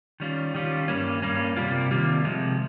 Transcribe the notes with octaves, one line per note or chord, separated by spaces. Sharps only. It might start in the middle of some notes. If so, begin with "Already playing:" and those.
D#3 G3 C#4 F4
D#3 G3 C#4 F4
G2 G3 A#3 C#4
G2 G3 A#3 C#4
C3 D#3 G3 A#3 F4
C3 D#3 G3 A#3 F4
C3 F3 G#3